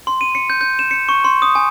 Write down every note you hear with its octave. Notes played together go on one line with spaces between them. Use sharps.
C6
D#7
C#7
G6
G6
E7
C#7
C#6
C6
D#6
G#5